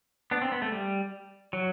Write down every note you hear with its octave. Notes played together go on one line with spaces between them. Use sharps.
B3 D4
C4
B3
A3
G3
F#3